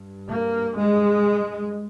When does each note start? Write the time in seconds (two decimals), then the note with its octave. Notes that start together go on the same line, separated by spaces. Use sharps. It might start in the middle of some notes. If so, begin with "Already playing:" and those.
Already playing: G2
0.29 A#3
0.76 G#3